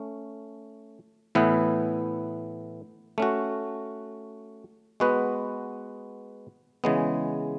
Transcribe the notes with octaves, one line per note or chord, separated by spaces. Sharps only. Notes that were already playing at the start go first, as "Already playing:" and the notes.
Already playing: A3 C#4
A2 E3 B3 E4 B4
A3 C#4 F#4
G#3 B3 F#4 B4
C#3 E3 G#3 B3